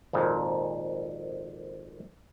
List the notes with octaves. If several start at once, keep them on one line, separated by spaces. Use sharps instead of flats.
G#1 F2 A#2